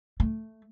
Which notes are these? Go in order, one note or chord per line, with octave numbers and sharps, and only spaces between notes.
A3